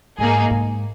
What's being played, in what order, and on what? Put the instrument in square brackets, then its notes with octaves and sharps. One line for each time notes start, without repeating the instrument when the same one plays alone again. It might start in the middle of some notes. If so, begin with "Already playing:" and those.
[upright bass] G#2 [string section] A#3 D#4 G#4
[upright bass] G#2